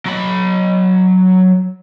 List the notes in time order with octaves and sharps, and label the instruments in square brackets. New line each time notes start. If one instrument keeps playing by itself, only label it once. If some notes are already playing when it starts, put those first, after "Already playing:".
[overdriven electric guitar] F#3 B5